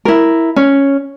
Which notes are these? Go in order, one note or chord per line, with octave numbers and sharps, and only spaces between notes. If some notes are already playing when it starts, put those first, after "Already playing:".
E4 A#4
C#4